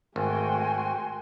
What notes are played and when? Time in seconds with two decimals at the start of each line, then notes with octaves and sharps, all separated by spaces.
0.16 G#1 A3 F#4 G5 G#5 C6